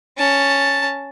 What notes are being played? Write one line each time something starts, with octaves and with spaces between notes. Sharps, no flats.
C#4 A5